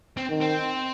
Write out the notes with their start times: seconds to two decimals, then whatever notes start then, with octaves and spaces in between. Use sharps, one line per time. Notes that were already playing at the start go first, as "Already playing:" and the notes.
0.17 C4
0.29 D#3
0.41 C4